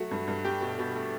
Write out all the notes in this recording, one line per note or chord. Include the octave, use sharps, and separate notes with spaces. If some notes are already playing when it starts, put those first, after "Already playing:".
Already playing: F#3 A3 F#4
G2
G2
A3 G4
B2
B2
A3